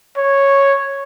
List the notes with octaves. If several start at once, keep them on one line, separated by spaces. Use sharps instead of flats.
C#5